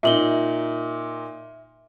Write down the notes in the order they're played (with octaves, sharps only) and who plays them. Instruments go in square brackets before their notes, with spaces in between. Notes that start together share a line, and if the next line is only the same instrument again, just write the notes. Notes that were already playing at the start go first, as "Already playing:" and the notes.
[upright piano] A#2 D#4 [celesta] E5 F#7 G7